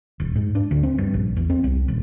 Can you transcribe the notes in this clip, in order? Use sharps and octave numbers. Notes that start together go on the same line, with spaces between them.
D#1
G#2
D4
D2
C4
G2
A#1
E2
C4
C2
D#1